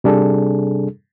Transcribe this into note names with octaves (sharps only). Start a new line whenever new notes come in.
C3 G3 D4 G#4 A4